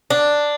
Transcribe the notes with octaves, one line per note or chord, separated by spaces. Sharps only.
D4